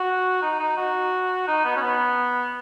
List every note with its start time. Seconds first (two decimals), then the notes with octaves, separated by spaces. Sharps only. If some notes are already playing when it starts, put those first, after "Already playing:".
Already playing: F#4
0.42 D#4
0.59 D#4
0.77 F#4
1.48 D#4
1.65 B3
1.76 C#4
1.82 B3